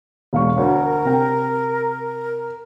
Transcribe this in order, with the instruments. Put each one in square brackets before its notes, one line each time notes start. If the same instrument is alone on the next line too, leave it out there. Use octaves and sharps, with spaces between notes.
[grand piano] E1 F5 C#6
[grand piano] D2 C#5 [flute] A#4
[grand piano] C3 G5